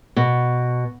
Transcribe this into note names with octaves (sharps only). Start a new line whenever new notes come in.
B2